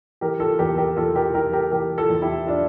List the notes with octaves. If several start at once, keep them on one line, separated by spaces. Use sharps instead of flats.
E3 G4 A#4
F4 A4
E2 G4 A#4
G4 A#4
E2 F4 A4
G4 A#4
E3 G4 A#4
G4 A#4
E3 G4 A#4
F4 A4
E2
E4 G4
D4 F4